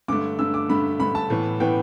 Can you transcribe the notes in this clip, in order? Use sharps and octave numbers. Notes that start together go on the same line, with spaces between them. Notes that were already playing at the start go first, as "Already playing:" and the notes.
G2 D3 A3 D6
G2 D3 A3 E6
D6
G2 D3 A3 B5
G2 D3 A3 B5
A5
A2 E3 B3
A2 E3 B3 G5